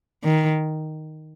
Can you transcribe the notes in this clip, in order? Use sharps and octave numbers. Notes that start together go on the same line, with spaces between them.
D#3